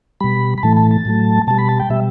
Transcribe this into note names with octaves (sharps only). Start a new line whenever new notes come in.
B2 G3 B5
B5
A2 E3 A3 A5
A5
A5
A2 F#3 A3
B2 G3 A5
B5
A5
G5
B2 G3 E5